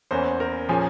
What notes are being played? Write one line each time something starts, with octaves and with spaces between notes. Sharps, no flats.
E2 E3 A#3 C#4 C5
A#4
A#2 F3 A#3 C#4 G#4